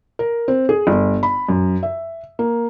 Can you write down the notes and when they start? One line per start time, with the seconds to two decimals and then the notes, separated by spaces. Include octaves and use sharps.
0.19 A#4
0.48 C4
0.69 G#4
0.87 G1
1.23 B5
1.49 F#2
1.83 E5
2.39 A#3